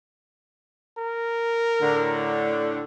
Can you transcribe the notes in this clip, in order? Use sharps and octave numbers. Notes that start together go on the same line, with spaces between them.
A#4
A2 D3